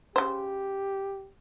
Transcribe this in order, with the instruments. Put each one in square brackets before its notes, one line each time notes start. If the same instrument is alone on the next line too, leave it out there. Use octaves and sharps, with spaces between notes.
[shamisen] C#3 C5 [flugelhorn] G4